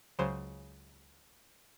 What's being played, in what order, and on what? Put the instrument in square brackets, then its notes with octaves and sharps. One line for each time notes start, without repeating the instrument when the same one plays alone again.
[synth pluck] C#2 C#3 F#3 C5